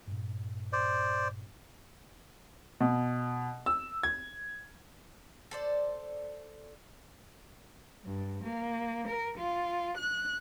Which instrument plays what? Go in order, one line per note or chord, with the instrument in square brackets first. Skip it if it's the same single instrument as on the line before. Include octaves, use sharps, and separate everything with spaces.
[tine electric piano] G2 A#2
[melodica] C5 D5
[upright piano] B2
E6
G#6
[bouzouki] A4 C5 D5
[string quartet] G2
A#3
A#4
F4
F#6